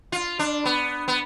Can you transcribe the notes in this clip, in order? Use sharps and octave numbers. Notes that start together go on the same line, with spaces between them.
F4
D4
B3
B3